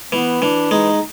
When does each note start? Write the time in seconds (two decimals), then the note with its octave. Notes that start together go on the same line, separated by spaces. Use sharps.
0.12 E3 B3
0.42 E3 D4
0.71 G#3 D#4